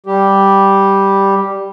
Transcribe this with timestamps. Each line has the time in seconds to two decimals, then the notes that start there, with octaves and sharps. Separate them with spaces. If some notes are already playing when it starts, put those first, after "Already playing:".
0.06 G3 G4